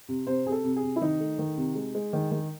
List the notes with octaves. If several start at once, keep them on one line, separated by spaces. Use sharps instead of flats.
C3
C3 C5
C3 G#4
A4
C3
G#4
C3
E4
D#3 D#4
A3
D#3
C3
G#3
G#3
D#3
D#3